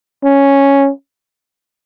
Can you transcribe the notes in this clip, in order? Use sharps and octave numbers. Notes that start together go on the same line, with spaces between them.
C#4